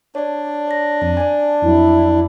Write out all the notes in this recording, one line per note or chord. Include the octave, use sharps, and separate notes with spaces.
D4 C#5 D5
C#5 A#6
F2 A5
D5 G#5 A5
F2 F#3 E4